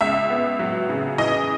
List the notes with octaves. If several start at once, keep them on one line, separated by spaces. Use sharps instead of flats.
C#2 E5
B3
F#3
C#3
E3 D#5